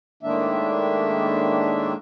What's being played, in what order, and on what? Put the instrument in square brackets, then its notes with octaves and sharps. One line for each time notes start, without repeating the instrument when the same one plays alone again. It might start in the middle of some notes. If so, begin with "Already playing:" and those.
[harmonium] A2 D#3 G#3 A#3 D4 E5